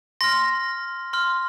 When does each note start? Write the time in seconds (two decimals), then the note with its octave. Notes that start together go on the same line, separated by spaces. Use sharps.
0.21 C6 F6 A#6
1.13 C6 F6